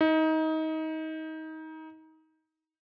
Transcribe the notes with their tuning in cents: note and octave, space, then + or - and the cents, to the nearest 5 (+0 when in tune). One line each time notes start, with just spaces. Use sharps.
D#4 +25